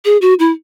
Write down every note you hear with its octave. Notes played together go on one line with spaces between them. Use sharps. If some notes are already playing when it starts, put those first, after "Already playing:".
G#4
F#4
E4